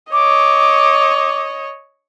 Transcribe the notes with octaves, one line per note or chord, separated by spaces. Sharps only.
C#5 D#5 D6